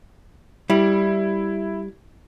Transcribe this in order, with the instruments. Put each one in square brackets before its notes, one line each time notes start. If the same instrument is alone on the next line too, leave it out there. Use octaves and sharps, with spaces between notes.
[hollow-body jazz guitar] G3 [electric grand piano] E4